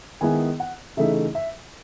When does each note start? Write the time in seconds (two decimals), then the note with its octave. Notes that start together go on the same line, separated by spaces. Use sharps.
0.21 D#3 G#3 B3 E4 G#5
0.60 F#5
0.97 C#3 E3 A3 D#4 E5
1.35 E5